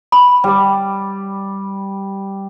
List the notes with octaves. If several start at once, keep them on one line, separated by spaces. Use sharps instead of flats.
B5
G3 D5